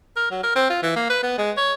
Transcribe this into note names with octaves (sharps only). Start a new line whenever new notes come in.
A#4
F#3
A#4
C4
F4
E3
A#3
B4
B3
G#3
C#5